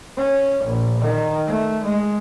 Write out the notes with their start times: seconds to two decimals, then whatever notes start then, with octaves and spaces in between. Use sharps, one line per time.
0.17 C#4
0.65 A#1
1.01 D#3
1.46 A3
1.85 G#3